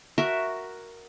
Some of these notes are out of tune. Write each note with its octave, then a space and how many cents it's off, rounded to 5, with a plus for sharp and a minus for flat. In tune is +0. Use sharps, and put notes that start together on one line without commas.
F#4 +0 A#4 +0 E5 +0